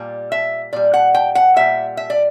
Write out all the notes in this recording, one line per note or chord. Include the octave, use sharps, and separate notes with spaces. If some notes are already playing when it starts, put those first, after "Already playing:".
Already playing: A#2 G3
E5
A#2 G3 D5
F#5
G5
F#5
A#2 G3 E5
E5
D5